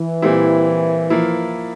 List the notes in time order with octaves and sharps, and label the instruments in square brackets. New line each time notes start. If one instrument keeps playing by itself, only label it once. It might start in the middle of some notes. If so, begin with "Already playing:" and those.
Already playing: [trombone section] E3
[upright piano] A#2 G3 C4 E4
F3 A#3 E4